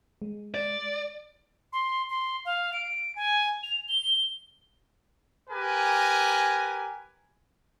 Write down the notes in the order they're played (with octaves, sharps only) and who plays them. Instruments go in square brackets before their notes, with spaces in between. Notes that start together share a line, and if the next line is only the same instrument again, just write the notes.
[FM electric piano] G#3
[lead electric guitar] D5
[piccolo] C6
C6
F5
D7
G#5
F7
G7
[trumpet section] G4 A#4 B4 G#5